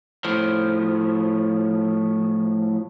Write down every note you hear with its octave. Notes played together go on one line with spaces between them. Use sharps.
A2 F3